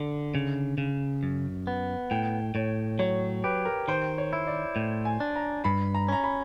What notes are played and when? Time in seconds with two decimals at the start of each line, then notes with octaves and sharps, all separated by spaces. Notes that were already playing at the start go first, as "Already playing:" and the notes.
Already playing: D3
0.35 C#3
0.78 C#3
1.23 F#2
1.67 B3
2.11 A2 G5
2.55 A2 C#5
2.99 F#3 C#5
3.44 G4 B4
3.65 A#4
3.88 D#3 C5
4.18 C#5
4.33 E4
4.47 D5
4.76 A2
5.05 G#5
5.20 D4
5.36 A#5
5.64 G2 B5
5.95 A#5
6.08 C#4 A#5
6.24 B5